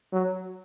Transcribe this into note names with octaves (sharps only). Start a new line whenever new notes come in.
F#3